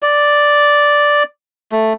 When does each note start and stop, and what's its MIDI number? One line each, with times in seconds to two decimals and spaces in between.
0.02 1.23 74
1.72 1.93 57